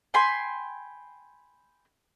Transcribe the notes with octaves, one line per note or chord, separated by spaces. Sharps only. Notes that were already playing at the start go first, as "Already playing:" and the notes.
G5 G#5 B5 C6